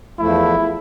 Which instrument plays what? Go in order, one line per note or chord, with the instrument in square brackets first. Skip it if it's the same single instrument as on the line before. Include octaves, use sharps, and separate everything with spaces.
[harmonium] E2 F3 A3 [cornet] E4